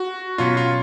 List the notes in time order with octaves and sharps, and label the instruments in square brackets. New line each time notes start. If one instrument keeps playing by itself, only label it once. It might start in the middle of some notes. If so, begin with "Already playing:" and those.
Already playing: [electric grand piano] F#4
[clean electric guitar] B2 F#3 C#4 [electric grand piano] F4
[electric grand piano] F4